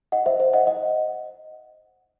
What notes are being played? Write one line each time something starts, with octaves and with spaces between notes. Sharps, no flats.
D#5 F#5
C5 E5
C5 E5
D#5 F#5
D#5 F#5